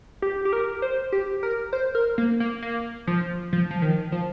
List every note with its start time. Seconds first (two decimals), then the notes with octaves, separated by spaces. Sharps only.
0.22 G4
0.45 G4
0.53 A#4
0.82 C5
1.12 G4
1.43 A#4
1.73 C5
1.95 A#4
2.18 A#3
2.40 A#3
2.62 A#3
3.07 F3
3.53 F3
3.71 F3
3.82 D#3
4.12 F3